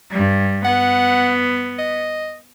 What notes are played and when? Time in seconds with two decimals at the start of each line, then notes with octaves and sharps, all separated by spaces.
0.11 G2 G3
0.65 B3 F#5
1.79 D#5